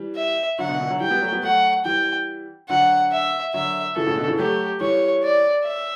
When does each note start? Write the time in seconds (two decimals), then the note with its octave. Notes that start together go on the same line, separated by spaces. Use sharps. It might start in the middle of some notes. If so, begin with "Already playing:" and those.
Already playing: E3 G3
0.16 E5
0.59 D3 F#3 F#5
0.69 B2 D3
0.80 B2 D3
0.90 D3 F#3
1.00 E3 G3 G5
1.11 G3 B3
1.21 F#3 A3
1.32 G3 B3
1.43 F#3 A3 F#5
1.85 E3 G3 G5
2.69 D3 F#3 F#5
3.12 E5
3.53 D3 F#3 E5
3.96 C#3 E3 A4
4.06 A2 C#3
4.17 B2 D3
4.28 C#3 E3
4.38 F#3 A3 G4
4.81 E3 G3 C#5
5.23 D5
5.65 E5